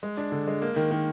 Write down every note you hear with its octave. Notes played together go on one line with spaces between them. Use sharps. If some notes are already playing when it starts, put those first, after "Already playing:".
G#3
D4
D3
G#3
A#3
D#3
D#3